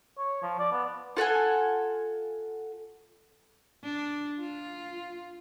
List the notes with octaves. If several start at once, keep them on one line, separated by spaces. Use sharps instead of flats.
C#5
F3
D5
B3
F4 A4 F#5 G#5
D4
F4